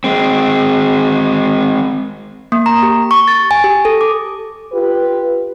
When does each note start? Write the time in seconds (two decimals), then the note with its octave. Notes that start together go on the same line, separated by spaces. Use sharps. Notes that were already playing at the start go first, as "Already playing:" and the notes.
0.04 G#3 C4
2.52 A#3
2.66 A#5
2.83 G4
3.11 C#6
3.28 A6
3.51 G#5
3.64 G4
3.85 A4
4.01 D6
4.73 F4 G4 B4